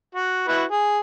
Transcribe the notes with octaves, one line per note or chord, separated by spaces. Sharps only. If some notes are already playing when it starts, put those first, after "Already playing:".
F#4
E4 F#4 B4
G#4